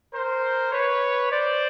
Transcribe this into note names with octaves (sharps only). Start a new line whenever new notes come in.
A#4 C5
B4 C#5
C5 D5